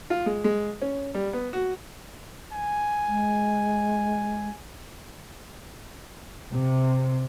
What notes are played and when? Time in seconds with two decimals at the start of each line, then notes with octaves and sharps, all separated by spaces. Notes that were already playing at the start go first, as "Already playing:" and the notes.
0.10 F4
0.26 G#3
0.44 G#3
0.82 C#4
1.14 G3
1.33 B3
1.53 F#4
2.53 G#5
3.07 G#3
6.51 C3